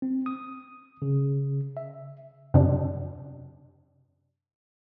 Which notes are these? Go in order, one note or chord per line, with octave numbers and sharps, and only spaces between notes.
C4
D#6
C#3
E5
F#2 C3 D4